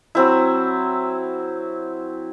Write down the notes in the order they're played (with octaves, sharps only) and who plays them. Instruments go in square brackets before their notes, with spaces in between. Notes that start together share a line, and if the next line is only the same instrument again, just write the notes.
[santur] F#3 C4 E4